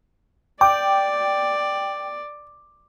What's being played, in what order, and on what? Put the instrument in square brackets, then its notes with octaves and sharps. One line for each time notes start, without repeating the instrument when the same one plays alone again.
[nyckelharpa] D5 [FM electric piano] G5 [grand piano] D6